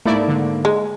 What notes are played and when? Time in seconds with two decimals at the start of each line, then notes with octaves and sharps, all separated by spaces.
0.05 G#2 A3 A#3 E4 D5
0.28 D3
0.65 G#3